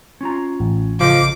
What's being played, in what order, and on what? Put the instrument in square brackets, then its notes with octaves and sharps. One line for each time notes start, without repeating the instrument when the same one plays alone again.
[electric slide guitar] C#4 F4 A#5
[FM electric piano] A1
[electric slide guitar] C#3 A4 D#5 [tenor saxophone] F3 [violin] D6